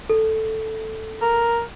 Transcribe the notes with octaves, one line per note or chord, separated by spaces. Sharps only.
A4
A#4